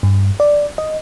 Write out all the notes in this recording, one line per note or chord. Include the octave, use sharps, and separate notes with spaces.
G2
D5
D#5